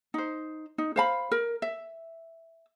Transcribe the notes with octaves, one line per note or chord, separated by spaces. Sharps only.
D#4 C5
D#4
C5 F5 B5
A#4
E5